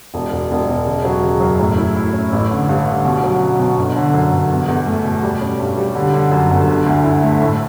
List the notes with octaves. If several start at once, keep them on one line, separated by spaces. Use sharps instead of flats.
E1
E1
E1
E1
C#3
F#3
C#3
F#2
A2
E4
E4
C#4
A1
D3
G2
D3
B2
F#3
C#4
B2
G1
D3
F#2
G1
E2
E2
A3
B2
G3
C#4
G2
G3
D3
D3
F#2
G1
D3
D2
E4
A3
A2